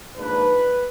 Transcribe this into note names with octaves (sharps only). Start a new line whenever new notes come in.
G#2 F3 A#3 D4 B4